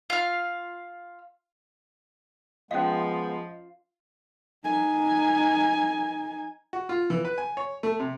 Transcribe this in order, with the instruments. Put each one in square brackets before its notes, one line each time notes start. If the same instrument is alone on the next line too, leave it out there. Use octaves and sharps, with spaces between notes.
[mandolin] F4 F5
[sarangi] F3 [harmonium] G#3 B3 [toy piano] C#4 F5 [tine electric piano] D#5
[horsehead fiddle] D#4 G#5
[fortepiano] F#4
F4
E3
B4
G#5
C#5
A3
C3